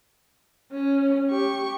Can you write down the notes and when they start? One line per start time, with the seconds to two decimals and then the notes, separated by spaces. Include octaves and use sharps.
0.72 C#4
1.30 G4 C#6